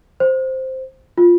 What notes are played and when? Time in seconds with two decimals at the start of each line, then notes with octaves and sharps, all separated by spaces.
0.20 C5
1.18 F4